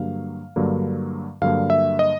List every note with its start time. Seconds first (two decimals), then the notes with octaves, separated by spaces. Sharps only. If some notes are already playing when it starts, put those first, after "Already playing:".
Already playing: G2 D3 F#3 A#3 F5
0.56 G2 D3 F#3 A#3
1.42 G2 D3 F#3 A#3 F5
1.70 E5
1.99 D#5